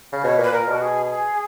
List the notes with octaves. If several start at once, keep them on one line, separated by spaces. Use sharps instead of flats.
C#3
B2 C#5
A#2 B4
A#2 A#4
B2 F#4
G#4
G#4